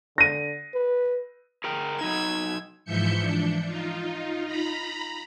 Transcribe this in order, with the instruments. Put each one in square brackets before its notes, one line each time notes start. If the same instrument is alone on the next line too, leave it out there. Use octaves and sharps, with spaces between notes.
[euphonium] D3 [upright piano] A#6 D#7
[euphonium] B4
[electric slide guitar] G#4 A#4 G5
[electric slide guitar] F#3 D#4 [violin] E6 G#6
[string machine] G#2 E3 F3 E5 G6 C#7
D4
D#4 F4
A#5 B5